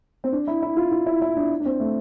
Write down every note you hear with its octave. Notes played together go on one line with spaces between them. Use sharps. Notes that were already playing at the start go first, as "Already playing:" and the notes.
C4
D4
E4
E4
F4
F4
E4
E4
D4
D4
C4
A3